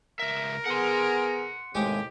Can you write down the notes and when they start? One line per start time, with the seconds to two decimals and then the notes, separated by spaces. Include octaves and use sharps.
0.20 C#2 A#4 E5
0.66 B3 G#4 F#5 C6
1.75 D#2 A2 C3 G#3 G4 G5 G#5